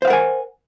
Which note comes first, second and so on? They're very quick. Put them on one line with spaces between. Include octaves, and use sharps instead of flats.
C5 F5 F#5 A#4 G#5